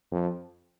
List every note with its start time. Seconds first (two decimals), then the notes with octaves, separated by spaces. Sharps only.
0.12 F2